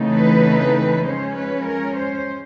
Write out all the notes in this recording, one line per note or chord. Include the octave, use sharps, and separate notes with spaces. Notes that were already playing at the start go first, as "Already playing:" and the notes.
Already playing: C#3 E3 A3 C4 D#4
B4
F3 G#3 C#4 C5
B4
A#4
C5